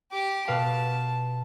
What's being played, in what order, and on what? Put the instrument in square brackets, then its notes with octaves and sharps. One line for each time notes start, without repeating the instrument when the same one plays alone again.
[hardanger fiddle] G4 D6
[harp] B2 B4 F5 [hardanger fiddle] A5